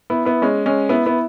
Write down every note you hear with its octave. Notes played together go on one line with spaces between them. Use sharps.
B3 E4
B3 E4
G#3 C#4
G#3 C#4
B3 E4
B3 E4